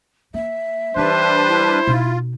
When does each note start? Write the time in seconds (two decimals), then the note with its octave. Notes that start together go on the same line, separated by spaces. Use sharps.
0.34 A#3 E5
0.96 E3 G3 D4 D#4 B4 C5
1.47 E4
1.87 B2 D#4 F4